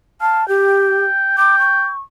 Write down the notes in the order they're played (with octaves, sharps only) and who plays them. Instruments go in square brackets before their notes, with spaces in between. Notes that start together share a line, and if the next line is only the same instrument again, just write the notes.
[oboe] F5 [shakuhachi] A5
[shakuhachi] G4 [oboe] G5
[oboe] G5 [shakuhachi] D6
[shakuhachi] C#6